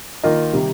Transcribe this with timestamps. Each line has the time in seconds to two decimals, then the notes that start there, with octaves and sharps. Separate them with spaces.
0.24 D#3 A#3 F4 A#4 D#5
0.53 C3 D#3 G3